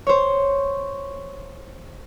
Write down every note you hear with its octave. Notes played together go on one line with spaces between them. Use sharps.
C5 C#5